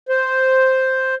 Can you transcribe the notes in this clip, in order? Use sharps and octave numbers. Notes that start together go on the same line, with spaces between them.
C5